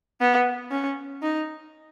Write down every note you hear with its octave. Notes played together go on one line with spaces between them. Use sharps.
B3
C#4
D#4